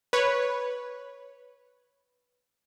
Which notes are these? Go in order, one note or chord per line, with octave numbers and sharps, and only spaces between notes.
B4 C#5